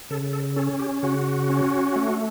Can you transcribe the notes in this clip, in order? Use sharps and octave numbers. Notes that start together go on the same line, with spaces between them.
C#3 A4
A4
C#4 A4
G4
C#3 F#4
C#4
A3